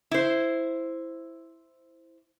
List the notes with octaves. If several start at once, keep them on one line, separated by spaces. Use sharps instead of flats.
E4 C5